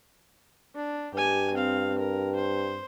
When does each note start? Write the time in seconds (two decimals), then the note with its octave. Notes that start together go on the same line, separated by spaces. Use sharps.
0.75 D4
1.14 G2 G4 G#5
1.54 C4 F5
1.99 A#4
2.35 C5